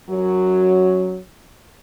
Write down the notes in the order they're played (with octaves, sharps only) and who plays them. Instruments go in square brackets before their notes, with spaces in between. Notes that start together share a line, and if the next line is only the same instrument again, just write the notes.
[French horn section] F#2 F#3